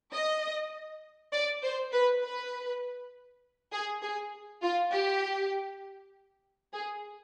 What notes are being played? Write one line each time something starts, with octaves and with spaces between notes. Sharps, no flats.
D#5
D5
C5
B4
B4
G#4
G#4
F4
G4
G#4